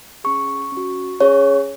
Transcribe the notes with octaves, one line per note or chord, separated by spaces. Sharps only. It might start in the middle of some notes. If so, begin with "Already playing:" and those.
C#4 G#4 C#6
C#4
F#4
C#4 G#4 C#5